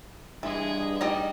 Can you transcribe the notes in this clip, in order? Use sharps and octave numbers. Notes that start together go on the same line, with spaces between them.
G2 E3 G#3 G#4
G3 D#4 D#5